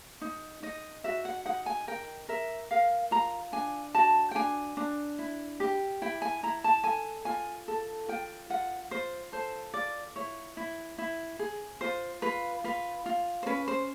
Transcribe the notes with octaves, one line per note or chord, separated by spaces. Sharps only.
D#4
D#4 D#5
F#4 E5
F#5
D#4 F#5
G#5
A#4 G5
A#4 E5
A#4 F5
F4 A#5
D4 G#5
F#4 A5
G5
D4 G#5
D4
E4
G4
E4 G5
G#5
E4 A#5
A5
A4 G#5
F4 G#5
A4
F4 G5
F4 F#5
F4 C5
A4 C5
F4 D5
E4 C#5
E4
E4
G#4
F4 C5
F4 B4
F4 B4
F4
C5
C#4 B4
C5